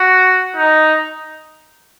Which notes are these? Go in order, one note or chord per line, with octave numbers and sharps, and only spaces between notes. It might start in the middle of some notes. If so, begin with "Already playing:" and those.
Already playing: F#4
D#4